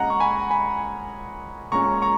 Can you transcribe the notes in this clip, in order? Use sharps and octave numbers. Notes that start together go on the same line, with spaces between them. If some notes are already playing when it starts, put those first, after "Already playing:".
Already playing: A#2 G#3 C#4 D#5 F#5 A#5
C#6
G#5 B5
G#5 B5
A#2 G#3 C#4 A#5 C#6
A#5 C#6